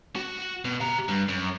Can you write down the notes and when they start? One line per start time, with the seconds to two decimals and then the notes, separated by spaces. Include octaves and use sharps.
0.16 F#4
0.65 B2
0.81 G4 A#5
1.08 G2
1.29 F#2